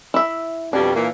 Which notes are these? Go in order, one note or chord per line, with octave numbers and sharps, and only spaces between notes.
E4 E5
F2 B2 G3 D4
A#2 E3 A#3